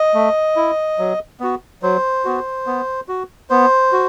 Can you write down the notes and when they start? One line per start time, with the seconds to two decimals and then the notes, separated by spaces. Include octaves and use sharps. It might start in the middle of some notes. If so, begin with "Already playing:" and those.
Already playing: D#5
0.14 A3
0.56 E4
0.99 F#3
1.40 B3 F#4
1.82 F#3 C5
2.25 B3 F#4
2.67 B3
3.08 F#4
3.50 B3 C5
3.93 F#4